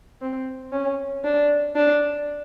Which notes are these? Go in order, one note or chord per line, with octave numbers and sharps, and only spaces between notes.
C4
C#4
D4
D4